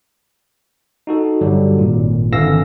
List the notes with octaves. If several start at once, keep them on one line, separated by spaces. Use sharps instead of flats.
D#4 F#4 A4
G2 D3 F#3 G3
G#1 A#2
G#1 D3 E3 F5 E6 A#6